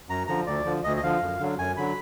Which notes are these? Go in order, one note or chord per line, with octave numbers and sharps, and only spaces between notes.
F#2 A#5
D3 F3 A#5
D2 D5
D3 F3
D2 D#5
D#5
D3 F3 F5
F#2
D3 F#3
F#2 G#5
D3 F#3 B5